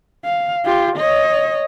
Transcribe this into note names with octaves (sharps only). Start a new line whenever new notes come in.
F5
F4 G4
C#5 D#5